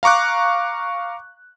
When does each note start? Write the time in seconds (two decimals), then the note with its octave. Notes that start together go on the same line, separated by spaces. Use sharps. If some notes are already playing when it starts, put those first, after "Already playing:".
0.03 F5 A#5 C#6 D6 F#6